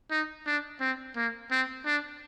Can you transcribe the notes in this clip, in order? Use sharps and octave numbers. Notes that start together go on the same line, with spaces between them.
D#4
D4
C4
A#3
C4
D4